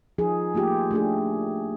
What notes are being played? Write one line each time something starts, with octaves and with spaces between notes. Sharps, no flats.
F3 D#4 G#4
A3 A#3 F4 G4
A3 D4 G#4